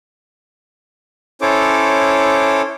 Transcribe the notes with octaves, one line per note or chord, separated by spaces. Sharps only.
C#4 E4 A4 C5 C#5 D6